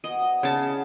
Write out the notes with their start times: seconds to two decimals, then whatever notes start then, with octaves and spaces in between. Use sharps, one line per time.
0.04 B3 F#4 D#5 G#5
0.19 F#3 D4 C5
0.43 C#3 A5
0.68 E4 D#5 F#5